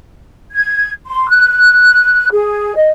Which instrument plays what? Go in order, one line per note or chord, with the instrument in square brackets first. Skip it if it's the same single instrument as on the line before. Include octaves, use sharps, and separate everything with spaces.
[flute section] G#6
C6
F#6
G#4
D#5